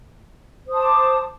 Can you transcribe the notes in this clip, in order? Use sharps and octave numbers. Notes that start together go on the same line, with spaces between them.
C5 A5 D6 D#6